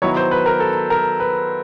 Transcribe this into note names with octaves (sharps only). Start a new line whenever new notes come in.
D#3 F#3 B3 E4 C#5
C5
B4
A#4
A4
A#4
B4